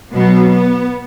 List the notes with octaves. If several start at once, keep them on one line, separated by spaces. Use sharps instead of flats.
B2 F#3 B3
B3